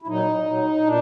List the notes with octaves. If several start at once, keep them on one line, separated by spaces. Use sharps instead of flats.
E4
A#2 F#3 D#4
A#2 F#3
A#2 D4